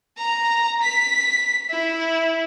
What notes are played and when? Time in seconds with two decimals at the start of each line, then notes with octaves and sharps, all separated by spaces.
0.18 A#5
0.82 B6
1.70 E4